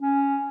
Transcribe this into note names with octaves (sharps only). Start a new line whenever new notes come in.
C#4